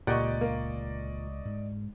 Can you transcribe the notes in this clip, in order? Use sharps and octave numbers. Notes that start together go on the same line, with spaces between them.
C#2 A#2 A3 G4 D5 D#5 F#5 C#6
A#3
G#2